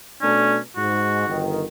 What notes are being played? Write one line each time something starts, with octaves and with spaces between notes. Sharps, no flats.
B2 A3 C#4 D4
G#2 F#4
G1 D#3